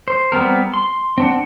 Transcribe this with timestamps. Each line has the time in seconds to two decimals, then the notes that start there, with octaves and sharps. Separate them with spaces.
0.08 C5
0.32 G3 B3 C4 A#4
0.74 C6
1.18 C4 D4 F#5